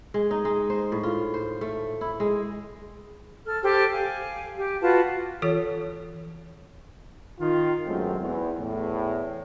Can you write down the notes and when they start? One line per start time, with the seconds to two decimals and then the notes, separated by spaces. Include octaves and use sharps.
0.14 G#3
0.31 D#4
0.45 G#3
0.70 C5
0.92 A2
1.03 F4
1.34 C5
1.61 A3
2.01 E4
2.20 G#3
3.47 A4 F6
3.62 G4 A4 C5
3.91 F5 G#5
4.56 G4
4.81 F4 F#4 B4 A5
5.42 E3 F4 A4 C#5
7.39 D#3 F4
7.86 F#2 G#3 A3 C4
8.20 E2
8.58 E2 A2